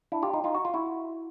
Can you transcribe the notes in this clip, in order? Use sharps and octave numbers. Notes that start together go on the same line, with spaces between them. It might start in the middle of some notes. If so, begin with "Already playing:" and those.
D4 E4
F4 G4
D#4 F4
D#4 F4
F#4
F4
E4 F#4